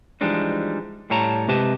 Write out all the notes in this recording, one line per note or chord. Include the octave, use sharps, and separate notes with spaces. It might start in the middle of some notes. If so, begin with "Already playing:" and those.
E3 F3 G3 G#3 D4 D#4
A2 G3 C#5 A5 A#5
C3 G#3 G4 B4 D#5 A5